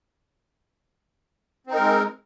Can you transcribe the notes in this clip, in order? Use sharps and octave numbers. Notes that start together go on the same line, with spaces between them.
G#3 C4 D#4 A#4